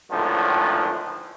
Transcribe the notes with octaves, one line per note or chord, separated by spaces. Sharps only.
G#1 C#2 A2 D3 D#3 F3